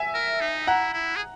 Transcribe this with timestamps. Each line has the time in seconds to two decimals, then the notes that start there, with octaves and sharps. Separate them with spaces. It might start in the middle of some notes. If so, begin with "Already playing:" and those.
Already playing: E5 G#5
0.14 A#4
0.41 D#4
0.67 E4 F#5 A#5
0.93 E4
1.16 G#4